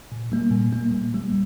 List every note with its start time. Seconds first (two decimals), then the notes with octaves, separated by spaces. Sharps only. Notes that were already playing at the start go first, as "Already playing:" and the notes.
0.12 A#2
0.32 G3 A#3
0.52 A#2
0.73 G3 A#3
0.94 A#2
1.14 G3 A#3